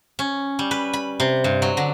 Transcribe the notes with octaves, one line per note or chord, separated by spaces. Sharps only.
C#4
G3
B4
B5
C3
G2
F#3
D3